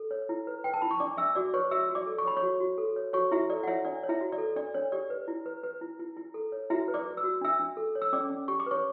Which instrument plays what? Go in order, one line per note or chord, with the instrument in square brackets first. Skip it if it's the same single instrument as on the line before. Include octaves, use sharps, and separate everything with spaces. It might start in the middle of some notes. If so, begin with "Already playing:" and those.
Already playing: [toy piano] A4
C#5
E4
B4
B4 G5
A5
E4 B5
C#6
D4 D5 D6
D4 E5 E6
F#4 D5 D6
B4 C#5 C#6
F#4 E5 E6
F#4
D5 D6
A4
C#6
C#5 B5
C#5 C#6
F#4
F#4
A4
C#5
F#4 C#5 C#6
E4 F#4 E5
A4 D5
F#5
E4 C#5 E5
D4 D5
C#5
E4 E5
F#4
D5
A4
D4 D5
D4 C#5
G4 D5
B4
E4
B4
B4
E4
E4
E4
A4
C#5
E4 F#4 E5
B4
D5 D6
B4
E6
F#4
D4 E5 E6
D4
A4
C#5
E6
C#4 D5 D6
C#4
G4 C#6
D6
B4 C#5 C#6